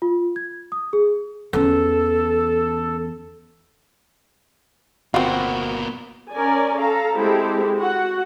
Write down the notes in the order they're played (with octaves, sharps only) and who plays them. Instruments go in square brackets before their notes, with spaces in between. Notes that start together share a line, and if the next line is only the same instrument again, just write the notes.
[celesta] F4
G#6
D#6
G#4
[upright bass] E2 C#4 [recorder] A4
[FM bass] G1 [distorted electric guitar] B2 A#3 [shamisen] C4 F4 [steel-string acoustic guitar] F#4
[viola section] C#4 A#4 D5 G#5
A4 F5 A#5
G#3 C4 E4 G4 A4
F#4 F#5